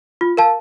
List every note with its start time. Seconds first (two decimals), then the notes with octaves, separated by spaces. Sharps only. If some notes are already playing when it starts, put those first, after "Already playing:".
0.21 F4
0.37 A#4 F5 A5